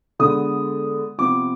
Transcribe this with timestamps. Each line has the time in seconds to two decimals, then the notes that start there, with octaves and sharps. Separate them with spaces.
0.19 D3 G#3 B3 D#6
1.18 C3 F3 B3 D6